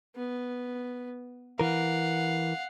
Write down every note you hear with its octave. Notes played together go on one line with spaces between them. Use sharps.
B3
E3 A#4 F5 F#5